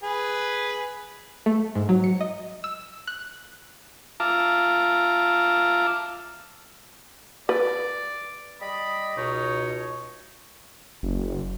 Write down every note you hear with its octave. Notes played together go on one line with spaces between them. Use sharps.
G#4 B4
A3
G#2
F#3
C#7
D#5
E6
F#6
F4 E5 F5 A5 A#5 D6
B4 D5
G3 D5 D#5 B5
C#2 B2 D#4 C#5
F#1